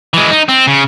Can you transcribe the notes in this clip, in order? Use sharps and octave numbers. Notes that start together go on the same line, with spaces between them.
E3 G#3
D#4
C4
C#3